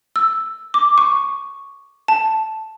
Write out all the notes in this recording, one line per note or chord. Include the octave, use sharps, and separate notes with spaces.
E6
D6
C#6
A5